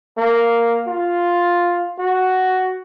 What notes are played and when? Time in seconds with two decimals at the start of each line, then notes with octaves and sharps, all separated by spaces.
0.18 A#3
0.87 F4
1.99 F#4